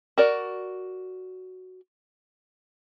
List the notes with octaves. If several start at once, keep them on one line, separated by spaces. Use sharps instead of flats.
F#4 A#4 D5